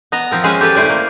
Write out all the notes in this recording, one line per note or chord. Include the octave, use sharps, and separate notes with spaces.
B3 D#5 A#5
F3 C4 A#4
G#3 C#4 G#4 B4 C5
G4 A4 B4 G#5
A3 E4 C5 D5 G#5
A#3